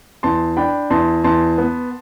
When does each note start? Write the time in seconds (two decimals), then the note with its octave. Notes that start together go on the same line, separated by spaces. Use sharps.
0.23 E2 A5 C6
0.57 D4 G5 B5
0.90 E2 A5 C6
1.24 E2 A5 C6
1.58 B3